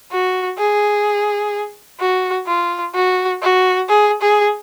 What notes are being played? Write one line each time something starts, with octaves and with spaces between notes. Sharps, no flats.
F#4
G#4
F#4
F4
F#4
F#4
G#4
G#4